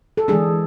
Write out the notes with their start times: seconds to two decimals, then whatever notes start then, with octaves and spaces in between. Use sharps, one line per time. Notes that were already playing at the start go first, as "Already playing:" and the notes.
0.17 A4
0.28 E3 G#3 D4 G#4